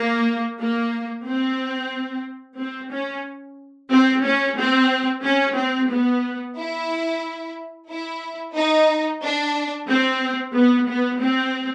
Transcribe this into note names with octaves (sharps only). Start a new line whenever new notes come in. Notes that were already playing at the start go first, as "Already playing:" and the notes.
Already playing: A#3
A#3
C4
C4
C#4
C4
C#4
C4
C#4
C4
B3
E4
E4
D#4
D4
C4
B3
B3
C4